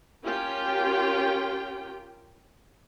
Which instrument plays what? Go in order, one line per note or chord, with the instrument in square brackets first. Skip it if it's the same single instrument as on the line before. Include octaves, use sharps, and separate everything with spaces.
[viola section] C#4 F4 G4 A#4 G5